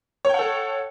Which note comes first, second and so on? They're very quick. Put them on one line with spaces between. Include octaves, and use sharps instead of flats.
C#5 G5 F#5 A4